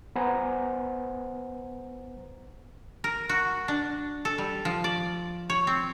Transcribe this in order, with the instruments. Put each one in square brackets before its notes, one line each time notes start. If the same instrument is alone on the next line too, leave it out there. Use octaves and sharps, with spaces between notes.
[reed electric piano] B3 B4 C5 F#5 G#5 A#5
[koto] A#4
F#4
D4
A4
G3
F3
D5
C#5
C4